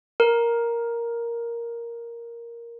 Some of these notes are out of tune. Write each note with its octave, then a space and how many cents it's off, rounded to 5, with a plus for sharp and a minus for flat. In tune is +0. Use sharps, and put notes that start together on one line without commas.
A#4 +5